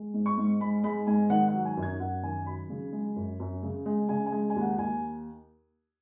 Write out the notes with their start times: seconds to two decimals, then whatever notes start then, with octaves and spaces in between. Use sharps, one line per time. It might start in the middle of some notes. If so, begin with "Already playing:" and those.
Already playing: G#3
0.14 G#2
0.26 C#6
0.38 G#2
0.61 G#3 B5
0.84 G#3 B5
1.07 G#2 G#5
1.30 D#3 F#5
1.48 F#5
1.53 F#3
1.65 G#5
1.77 F#2
1.83 G#6
1.99 F#2 F#5
2.23 D#3 G#5
2.46 F#3 B5
2.70 C#3
2.92 G#3
3.16 F#2
3.40 F#2
3.63 C#3
3.86 G#3
4.09 C#3 G#5
4.26 G#5
4.32 G#3
4.50 G#5
4.56 D#2
4.61 F#5
4.78 D#2 G#5